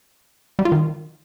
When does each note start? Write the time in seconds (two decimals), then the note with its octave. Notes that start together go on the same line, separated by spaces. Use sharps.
0.59 G3
0.65 F4
0.72 D#3